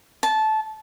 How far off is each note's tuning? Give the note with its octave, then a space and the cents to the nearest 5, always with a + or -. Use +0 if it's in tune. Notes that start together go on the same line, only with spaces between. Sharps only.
A5 -15